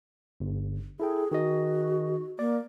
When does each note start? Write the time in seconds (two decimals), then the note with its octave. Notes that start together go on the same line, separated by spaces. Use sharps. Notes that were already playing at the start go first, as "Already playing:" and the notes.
0.40 G1
1.00 E4 G#4 A4 G5
1.32 D#3 F#4 G#4 D#5
2.39 A#3 D5